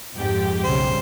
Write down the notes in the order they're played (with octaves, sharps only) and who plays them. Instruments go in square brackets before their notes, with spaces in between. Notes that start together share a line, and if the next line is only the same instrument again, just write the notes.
[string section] F2 G#2 G4
[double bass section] B1 C#3 G3 [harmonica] C5